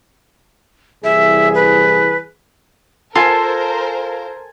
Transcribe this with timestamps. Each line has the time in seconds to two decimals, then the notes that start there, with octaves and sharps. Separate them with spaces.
1.04 C2 E3 G#4 E5
1.55 B4
3.15 F4 A4 A#4 C5 G#5 A5